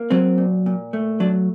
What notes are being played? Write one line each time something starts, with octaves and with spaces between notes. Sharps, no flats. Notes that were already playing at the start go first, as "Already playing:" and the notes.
Already playing: A#3
F#3 C4
A#2
A#2
A3
F#3 D4